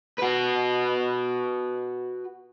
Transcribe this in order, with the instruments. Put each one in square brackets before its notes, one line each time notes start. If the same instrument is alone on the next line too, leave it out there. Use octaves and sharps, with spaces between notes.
[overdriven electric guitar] F#4 B4